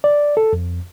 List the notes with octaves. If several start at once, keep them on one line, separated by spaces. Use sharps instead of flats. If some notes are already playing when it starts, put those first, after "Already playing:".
D5
A4
F2